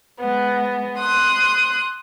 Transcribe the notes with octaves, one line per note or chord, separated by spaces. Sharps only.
G#3 B3
C6 D#6 F#6